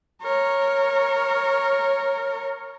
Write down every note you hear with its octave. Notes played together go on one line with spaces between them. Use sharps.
A#4 C#5